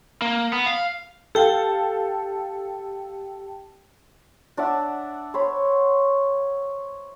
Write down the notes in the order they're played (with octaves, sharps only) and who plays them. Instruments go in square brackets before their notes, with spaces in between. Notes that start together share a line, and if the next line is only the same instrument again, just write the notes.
[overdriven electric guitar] A#3
B3
F5
[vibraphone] G4 G5 A5 [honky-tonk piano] A4 F5
[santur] D4 D5 E5 F#5
C5 C#5 B5